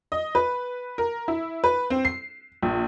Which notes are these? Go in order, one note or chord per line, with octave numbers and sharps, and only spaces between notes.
D#5
B4
A#4
E4
B4
C4
C7
A#1